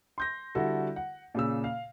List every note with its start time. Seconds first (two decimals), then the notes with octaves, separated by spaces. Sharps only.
0.18 C6 G6 A#6
0.55 D3 G3 E4 F#4 A4
0.96 F#5
1.35 A#2 C#3 E6
1.64 F5